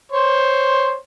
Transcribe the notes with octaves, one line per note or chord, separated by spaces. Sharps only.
C5 C#5 C6